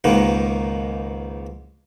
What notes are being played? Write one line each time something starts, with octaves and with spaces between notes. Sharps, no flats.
C#2 G#2 D#3 A#3 B3